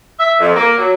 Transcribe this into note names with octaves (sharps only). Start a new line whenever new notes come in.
E5
F2
A#3
F#3